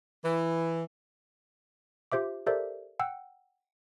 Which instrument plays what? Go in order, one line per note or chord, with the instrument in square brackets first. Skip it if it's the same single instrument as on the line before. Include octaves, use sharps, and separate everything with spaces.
[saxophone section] E3
[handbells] F4 G4 C5 E5 D6
G4 A4 A#4 C5 D5 E5
F#5 G5 E6